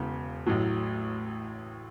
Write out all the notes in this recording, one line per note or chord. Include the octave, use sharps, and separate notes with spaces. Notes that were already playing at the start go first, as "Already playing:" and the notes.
Already playing: E1 E2 C#3
A1 A2 F#3